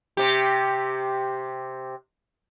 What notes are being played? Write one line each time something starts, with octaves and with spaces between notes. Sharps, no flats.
C3 G4